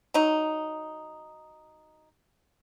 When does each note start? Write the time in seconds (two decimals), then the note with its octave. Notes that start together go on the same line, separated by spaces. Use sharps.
0.14 F#3 D#4